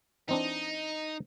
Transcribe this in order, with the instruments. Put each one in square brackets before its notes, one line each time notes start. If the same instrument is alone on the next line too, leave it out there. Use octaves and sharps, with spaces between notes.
[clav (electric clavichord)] E3 C4 D4 [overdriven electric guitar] D#4